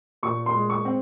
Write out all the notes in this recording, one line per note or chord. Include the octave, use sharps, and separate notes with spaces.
A#2 C#6
C6
G#3
C#6
C4